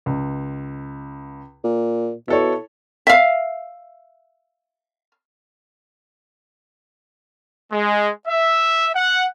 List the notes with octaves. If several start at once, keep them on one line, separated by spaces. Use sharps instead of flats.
C#2
A#2
B2 E4 A4 C#5
E5 F5
G#3
E5
F#5